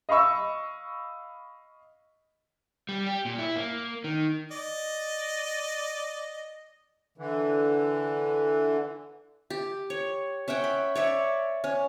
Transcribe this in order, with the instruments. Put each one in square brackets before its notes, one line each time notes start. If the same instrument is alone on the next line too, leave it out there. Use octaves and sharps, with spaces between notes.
[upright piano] D#5 F5 B5 C#6 E6
[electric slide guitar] G3
G4
A#2
E4
A#3
D#3
[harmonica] D5 D#5
[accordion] D3 E3
[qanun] G4
C#5
C#4 E5 F#5 G5
B5
C#5 D5 E5
C#4